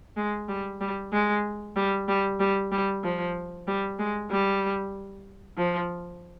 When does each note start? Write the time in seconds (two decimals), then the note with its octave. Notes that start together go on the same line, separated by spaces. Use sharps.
0.17 G#3
0.48 G3
0.81 G3
1.13 G#3
1.76 G3
2.08 G3
2.40 G3
2.72 G3
3.04 F3
3.67 G3
3.99 G#3
4.31 G3
5.58 F3